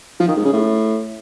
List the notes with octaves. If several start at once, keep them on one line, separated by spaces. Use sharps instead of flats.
F3
D#3
G#2
C#3
A2